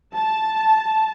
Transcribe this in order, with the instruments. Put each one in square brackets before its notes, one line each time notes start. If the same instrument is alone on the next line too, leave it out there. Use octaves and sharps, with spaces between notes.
[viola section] A5